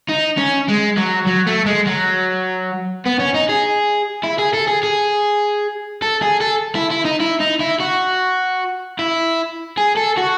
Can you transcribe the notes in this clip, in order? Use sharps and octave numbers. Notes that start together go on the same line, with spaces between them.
D#4
C#4
G#3
F#3
F#3
A3
G#3
F#3
B3
C#4
D#4
G#4
E4
G#4
A4
G#4
G#4
A4
G#4
A4
E4
E4
D#4
E4
D#4
E4
F#4
E4
G#4
A4
F#4